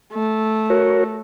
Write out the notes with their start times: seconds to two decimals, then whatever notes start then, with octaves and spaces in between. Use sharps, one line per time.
0.13 A3
0.70 F#4 A#4 C#5